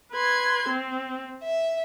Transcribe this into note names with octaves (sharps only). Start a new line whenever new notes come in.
B4 C6 G#6
C4
E5